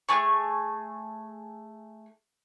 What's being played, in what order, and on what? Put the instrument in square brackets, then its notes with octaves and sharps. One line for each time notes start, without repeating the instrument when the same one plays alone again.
[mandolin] A3 G#4 C#6